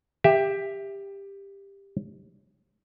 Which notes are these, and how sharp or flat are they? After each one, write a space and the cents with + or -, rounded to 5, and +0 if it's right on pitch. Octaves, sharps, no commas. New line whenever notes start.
G4 +15 E5 +0